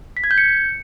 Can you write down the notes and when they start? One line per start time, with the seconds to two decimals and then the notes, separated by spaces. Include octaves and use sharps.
0.17 B6
0.24 G#6
0.31 G6
0.38 C#7